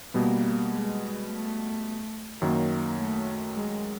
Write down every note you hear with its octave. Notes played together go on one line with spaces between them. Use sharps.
B2 G3 A#3 B3
G#3
A3
F#2 D#3 F#3 A#3
A3
G#3